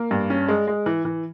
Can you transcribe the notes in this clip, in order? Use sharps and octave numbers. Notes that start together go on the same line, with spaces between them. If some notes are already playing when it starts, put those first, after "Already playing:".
Already playing: A#3
G2
C#4
G#3
G#3
E3
E3